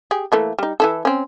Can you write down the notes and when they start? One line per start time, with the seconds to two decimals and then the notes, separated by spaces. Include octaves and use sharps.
0.11 G4 G#4
0.32 E3 A3 A#3
0.59 G3 D#4
0.80 E3 E4 A4
1.05 C4 C#4